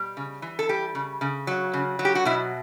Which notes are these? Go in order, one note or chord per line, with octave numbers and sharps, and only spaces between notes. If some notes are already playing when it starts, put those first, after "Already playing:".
Already playing: B2 G3
C#3
E3
A4
G3 G4
C#3
C#3
F#3
C#3
F#3
G4
F#4
B2 E4